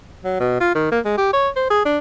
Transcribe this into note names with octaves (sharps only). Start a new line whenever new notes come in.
F#3
B2
F4
D#3
A#3
G#3
G4
C#5
C5
G#4
D4